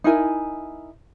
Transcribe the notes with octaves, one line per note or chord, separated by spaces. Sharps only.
D#4 E4 A#4 G#5